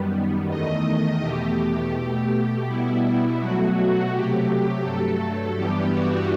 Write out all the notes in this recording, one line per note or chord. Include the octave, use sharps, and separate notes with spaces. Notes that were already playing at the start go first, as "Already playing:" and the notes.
Already playing: F#2 D#3 G3 B3
E2 D#3 A3 D#5
D#5
E2 B2 A3 G4
B2 A3 G4
B2 G3 B3 E4
B2 F#3 A3 F#4
C3 F#3 A3 G4
G2 F#3 A3 A4
G2 E3 G3 B3 G4
F#4